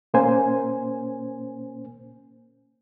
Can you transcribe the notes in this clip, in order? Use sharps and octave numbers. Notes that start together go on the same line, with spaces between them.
A#2 A#3 C#4 C5 G#5